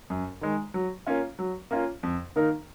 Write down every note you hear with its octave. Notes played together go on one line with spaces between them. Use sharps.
F#2
D#3 G#3
F#3
A#3 C#4 F4
F#3
A#3 C#4 F4
F2
D#3 A#3 D#4 A#4